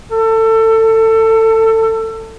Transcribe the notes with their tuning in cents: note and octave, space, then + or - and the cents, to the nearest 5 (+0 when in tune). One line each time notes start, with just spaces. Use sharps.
A4 +25